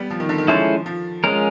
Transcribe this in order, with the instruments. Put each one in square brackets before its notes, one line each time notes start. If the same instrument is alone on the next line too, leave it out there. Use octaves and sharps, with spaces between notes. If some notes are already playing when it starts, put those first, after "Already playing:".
Already playing: [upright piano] G3 B3
F3
D#3
D3
D#3
[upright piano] F3 [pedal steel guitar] G#3 C#4 E4 A4 C5
[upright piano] F3
[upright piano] F3 [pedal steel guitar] G#3 C#4 F4 A#4